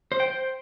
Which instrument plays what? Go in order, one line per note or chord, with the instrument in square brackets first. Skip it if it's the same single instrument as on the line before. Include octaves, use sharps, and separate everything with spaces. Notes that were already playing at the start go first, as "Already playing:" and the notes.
[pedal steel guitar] C5
G5
C5